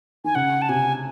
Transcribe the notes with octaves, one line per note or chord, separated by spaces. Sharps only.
D#3 G#5
C#3 F#5
A5
C3 G#5